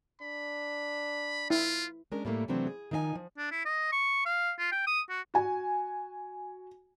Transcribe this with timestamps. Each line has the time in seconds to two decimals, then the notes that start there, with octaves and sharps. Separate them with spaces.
0.22 D4 B5
1.50 E4 F4
2.12 G#3 C#4 D4 A#4
2.25 A2 G3 A3 A#3
2.48 C3 E3 F#3 A3 C4 D4
2.67 G#4
2.91 D#3 F3 D#4 E5 G#5
3.15 F3
3.38 D4
3.51 E4
3.66 D#5
3.92 C#6
4.26 F5
4.59 F4
4.72 G5
4.87 D#6
5.10 F#4
5.34 F#4 G#5